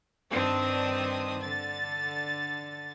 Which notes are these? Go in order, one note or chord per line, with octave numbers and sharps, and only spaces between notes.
G2 D#3 C4 D4 D#6
D3 A6